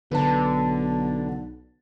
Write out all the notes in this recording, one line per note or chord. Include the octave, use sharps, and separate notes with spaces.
B1 D3 B4 A5